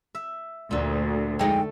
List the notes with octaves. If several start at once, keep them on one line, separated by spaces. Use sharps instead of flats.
E5
D2 A#2 D3
F2 G#3 A3 D#4 G5